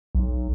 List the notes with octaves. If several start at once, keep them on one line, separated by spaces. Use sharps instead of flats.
B1